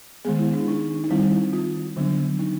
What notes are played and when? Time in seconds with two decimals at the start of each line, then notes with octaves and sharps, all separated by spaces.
0.25 D#3 G#3 B3 G#4
0.39 E4
0.53 D4
0.68 D#4
1.04 D#4
1.10 D#3 G3 C4 E4
1.53 F4
1.96 D3 F#3 B3 D4
2.39 D#4